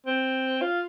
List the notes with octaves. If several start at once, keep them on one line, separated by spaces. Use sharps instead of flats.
C4
F4